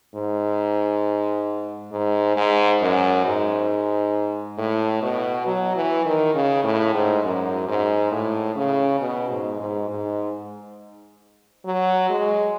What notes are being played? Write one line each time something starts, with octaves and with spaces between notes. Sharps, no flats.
G#2
G#2
G#2
F#2
G#2
A2
B2
F#3
E3
D#3
C#3
A2
G#2
F#2
G#2
A2
C#3
B2
G#2
G#2
G#2
F#3
G#3